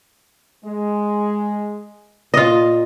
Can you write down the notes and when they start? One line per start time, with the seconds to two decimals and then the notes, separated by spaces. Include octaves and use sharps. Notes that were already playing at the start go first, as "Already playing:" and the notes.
0.65 G#3
2.34 A#2 F4 D#5